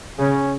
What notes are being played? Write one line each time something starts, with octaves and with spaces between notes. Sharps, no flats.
C#3 C#4